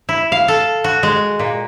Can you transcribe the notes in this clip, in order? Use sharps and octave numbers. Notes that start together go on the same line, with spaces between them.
E4
F5
A4
F#4
G#3
A#2